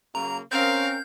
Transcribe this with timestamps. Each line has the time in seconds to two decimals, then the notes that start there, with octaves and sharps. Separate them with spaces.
0.15 C#3 F#3 A#3 A#5
0.52 C4 C#4 A#4 F5 G6